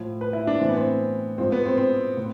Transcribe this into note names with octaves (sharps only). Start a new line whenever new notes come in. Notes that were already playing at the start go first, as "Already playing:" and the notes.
Already playing: A2 F3
B4
E4
D4
A2 E3 C4
B3
C4
G#2 F3 C4
B3
C4
C4
A2